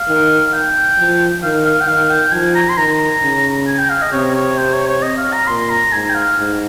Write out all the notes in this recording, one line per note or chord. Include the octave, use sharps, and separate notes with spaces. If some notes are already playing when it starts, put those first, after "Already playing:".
Already playing: F5
D#3
F5
G5
F3
D#3 F5
F5
G5
D#3 F5
G5
F3 G#5
A#5
C6
D#3 A#5
C#3
G#5
G5
F5
D#5
C3 C#5
C#5
C5
C#5
C#5
D#5
F5
A#5
A#2 C6
A#5
G#2 G#5
G5
F5
G#2